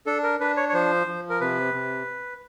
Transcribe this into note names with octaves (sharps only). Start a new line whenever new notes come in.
D4 A4
A#4
D4 B4
C#5
C#5
F3 C5
F3
A#4
C3 B4
C3